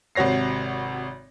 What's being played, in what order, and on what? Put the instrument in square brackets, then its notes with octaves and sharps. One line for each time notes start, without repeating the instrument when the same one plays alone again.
[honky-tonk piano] G#1 C3 F#4 C#5 A#6 C7